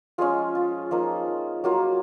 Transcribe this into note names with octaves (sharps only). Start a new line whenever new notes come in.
F3 G#3 C#4 F4 G#4
F4
F3 A#3 D#4
F#3 A#3 F4